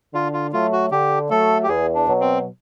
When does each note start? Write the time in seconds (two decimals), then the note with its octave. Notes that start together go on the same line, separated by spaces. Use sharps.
0.14 D3 F4
0.33 F4
0.53 F#3 A3 F4
0.72 F#4
0.92 D3 G4
1.30 F#3 A3 A4
1.63 G4
1.68 E2 G#4
1.95 D4
2.07 B2 F#3
2.20 C4